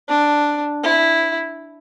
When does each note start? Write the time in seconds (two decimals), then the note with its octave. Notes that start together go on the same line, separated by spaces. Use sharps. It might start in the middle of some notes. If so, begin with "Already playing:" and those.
0.08 D4
0.83 E4